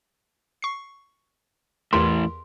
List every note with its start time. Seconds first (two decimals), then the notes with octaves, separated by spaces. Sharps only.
0.62 C#6 C7
1.93 E2 A2 E3 G4 A#4 C6